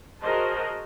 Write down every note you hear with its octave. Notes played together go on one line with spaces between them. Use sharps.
F#4 G#4 A#4 C5 D#5 A5